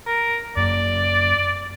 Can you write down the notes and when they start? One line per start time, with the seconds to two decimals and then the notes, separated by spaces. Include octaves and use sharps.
0.07 A#4
0.57 F#2 A#3 D5